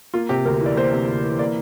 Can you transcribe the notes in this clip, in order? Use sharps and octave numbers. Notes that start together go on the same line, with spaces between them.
A#3 F4
C3 G4
D2 A#4
E3
D5
A#3 C5
C3
D2
E3
A#3 D5